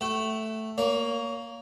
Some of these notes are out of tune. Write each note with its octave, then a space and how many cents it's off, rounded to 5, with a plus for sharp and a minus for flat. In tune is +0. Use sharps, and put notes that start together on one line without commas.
A3 +0 F#5 +45
A#3 +0 C#5 +30